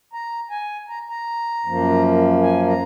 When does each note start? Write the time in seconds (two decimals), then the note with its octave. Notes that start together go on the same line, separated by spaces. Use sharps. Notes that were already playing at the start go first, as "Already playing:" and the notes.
0.13 A#5
0.50 G#5
0.89 A#5
1.09 A#5
1.66 F#2 F3 A#3
2.43 G#5
2.67 A#5